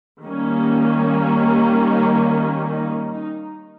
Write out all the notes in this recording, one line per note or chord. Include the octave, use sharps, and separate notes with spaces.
D#3 G3 A#3 C#4
D#4
D#4